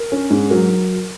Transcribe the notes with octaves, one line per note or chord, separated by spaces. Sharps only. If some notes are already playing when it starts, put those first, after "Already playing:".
Already playing: A#4
C#4
G#2
F#3 A#4